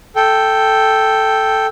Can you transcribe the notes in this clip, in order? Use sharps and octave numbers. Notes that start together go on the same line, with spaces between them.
A4 G5